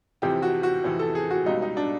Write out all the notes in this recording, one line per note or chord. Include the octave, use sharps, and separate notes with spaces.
F2 C3 E3 G4
F#4
F#4
F2 C3 E3
A4
G#4
F#4
C#2 B2 G3 D#4
D#4
D4